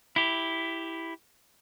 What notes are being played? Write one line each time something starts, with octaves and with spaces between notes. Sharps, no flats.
E4 G4